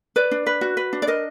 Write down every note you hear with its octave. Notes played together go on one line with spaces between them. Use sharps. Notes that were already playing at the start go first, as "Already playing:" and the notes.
B4 D5
D4
B4
F#4
B4
D4
D5
A#4 D#5